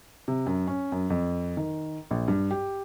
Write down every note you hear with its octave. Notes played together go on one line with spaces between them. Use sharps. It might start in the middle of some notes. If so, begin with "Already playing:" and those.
C3
F#2
C#4
F#2
F2
D#3
A#1
G2
G4